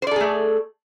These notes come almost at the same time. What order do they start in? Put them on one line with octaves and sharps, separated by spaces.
C5 D5 A4 G#4 A3